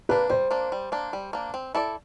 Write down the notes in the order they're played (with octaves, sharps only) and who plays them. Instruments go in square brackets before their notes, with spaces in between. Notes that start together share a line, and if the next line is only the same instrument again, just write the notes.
[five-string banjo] A#3 D4 [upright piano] B4
[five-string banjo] G3 [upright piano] C5
[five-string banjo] A#3 D4
G3
A#3 D4
G3
A#3 D4
C4
E4 A4 D5